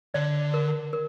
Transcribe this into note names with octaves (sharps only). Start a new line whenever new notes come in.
D3 D5
A#4
A#4